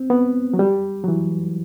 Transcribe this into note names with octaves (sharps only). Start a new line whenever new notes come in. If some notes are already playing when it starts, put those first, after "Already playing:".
Already playing: C4
B3
F#3
G3
F#3
E3